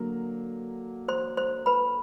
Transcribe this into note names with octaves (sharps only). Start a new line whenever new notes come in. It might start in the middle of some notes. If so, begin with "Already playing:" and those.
Already playing: D3 F#3 A#3
C5 C6
C5 C6
B4 B5